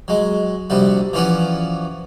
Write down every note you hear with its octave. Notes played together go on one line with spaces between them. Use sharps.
F#3 G#3
A#1 C3 G3 F#4
E3 F3 C#4 F#4 D5